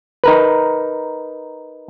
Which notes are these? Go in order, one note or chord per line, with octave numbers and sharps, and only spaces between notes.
D#4 A#4 B4